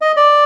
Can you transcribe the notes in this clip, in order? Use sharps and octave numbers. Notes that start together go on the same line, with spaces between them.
D#5
D5